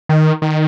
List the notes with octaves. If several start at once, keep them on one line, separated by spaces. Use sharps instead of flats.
D#3
D#3